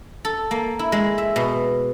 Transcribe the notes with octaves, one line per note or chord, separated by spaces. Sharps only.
A4
A#3
E4
G#3
E5
B2